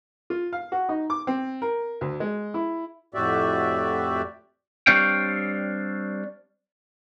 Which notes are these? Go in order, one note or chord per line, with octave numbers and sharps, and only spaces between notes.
F4
F5
F#4
D#4
D6
C4
A#4
D2
G#3
E4
F2 A2 F#4 G4 D5 E5
G3 C4 D4 C#5 F5 G5